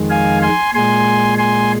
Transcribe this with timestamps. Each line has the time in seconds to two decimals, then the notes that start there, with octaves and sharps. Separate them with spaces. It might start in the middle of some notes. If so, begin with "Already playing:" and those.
Already playing: F2 D#3 G#3
0.10 F5 G#5
0.42 G#5 C6
0.74 A#2 G#3 G#5 C6
1.38 G#5 C6